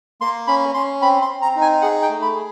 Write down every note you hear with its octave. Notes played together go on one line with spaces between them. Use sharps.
A#3 C6
C#4 B5
C#4 C6
C4 B5
C6
C4
A#5
D#4
G#5
G#4 F#5
G5
A3
B5
G#4